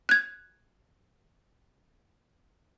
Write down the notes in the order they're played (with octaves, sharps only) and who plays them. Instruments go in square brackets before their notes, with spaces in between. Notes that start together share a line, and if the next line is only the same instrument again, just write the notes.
[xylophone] F#6 G#6